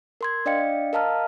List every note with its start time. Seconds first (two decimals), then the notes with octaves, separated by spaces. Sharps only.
0.21 A#4 C6 G#6
0.46 D4 D5 D#5 F5 G5 C#7
0.93 A#4 D#5 F5 A5 A#5 F6